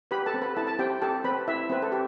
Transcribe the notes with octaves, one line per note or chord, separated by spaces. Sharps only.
G4 B4 B5
A4 A5
C4
B4 B5
E4 A4 A5
A5
C4 G4 G5
G4 A4 A5
C4 B4 B5
E4 E5
C4 B4
A4
G4